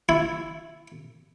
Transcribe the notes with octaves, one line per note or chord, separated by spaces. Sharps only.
E4